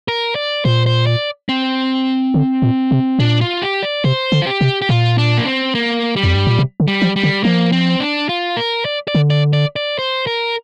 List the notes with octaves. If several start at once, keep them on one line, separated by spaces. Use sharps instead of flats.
A#4
D5
A#2 C5
C5
D5
C4
D3
A#2
C3
A#2 D4
F4
G4
D5
C3 C5
D3
F4
G4
C3
G4
A#2 F4
D4
A#3
C4
A#3
G3
F2
G2
A#2
C3
D3
G3
F3
G3
D3
F3 A#3
C4
D4
F4
A#4
D5
D5
D3
D5
D5
D5
C5
A#4